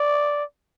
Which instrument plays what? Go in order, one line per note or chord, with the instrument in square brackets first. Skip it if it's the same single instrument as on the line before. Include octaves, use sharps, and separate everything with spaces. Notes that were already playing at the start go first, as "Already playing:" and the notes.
Already playing: [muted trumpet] D5